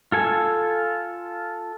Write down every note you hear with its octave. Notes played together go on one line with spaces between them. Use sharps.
F4 A4 G#5